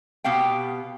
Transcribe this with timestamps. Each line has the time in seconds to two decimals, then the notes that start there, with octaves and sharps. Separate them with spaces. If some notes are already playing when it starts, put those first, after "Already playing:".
0.24 B2 B3 G4 F5 G5